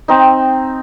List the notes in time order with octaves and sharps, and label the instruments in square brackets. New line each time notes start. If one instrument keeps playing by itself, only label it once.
[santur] C4 D#4